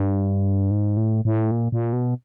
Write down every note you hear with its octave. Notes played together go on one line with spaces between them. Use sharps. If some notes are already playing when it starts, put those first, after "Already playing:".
Already playing: G2
G#2
A2
A2
A#2
A#2
B2